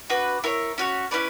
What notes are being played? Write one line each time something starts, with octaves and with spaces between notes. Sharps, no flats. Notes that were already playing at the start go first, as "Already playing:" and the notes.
D4 F#4 B4
E4 A#4 C#5
C#4 F#4 C#5
C#4 E4 B4 D5